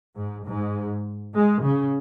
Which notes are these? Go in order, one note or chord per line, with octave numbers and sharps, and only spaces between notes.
G#2
G#2
G#3
C#3